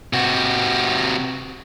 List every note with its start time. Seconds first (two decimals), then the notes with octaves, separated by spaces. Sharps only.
0.13 C3 F#4